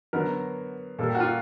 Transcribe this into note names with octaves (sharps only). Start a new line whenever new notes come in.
D3 F#3 B3 A#4
A#2 G3 A#3 A4
G4
F#4
F4